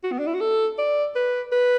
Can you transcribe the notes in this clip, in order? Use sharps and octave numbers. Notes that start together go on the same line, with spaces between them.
F#4
B3
D4
E4
F#4
A4
D5
B4
B4